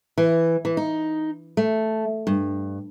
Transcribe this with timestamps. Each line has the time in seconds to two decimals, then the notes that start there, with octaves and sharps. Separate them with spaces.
0.18 E3
0.65 E3
0.77 D#4
1.57 A3
2.27 G2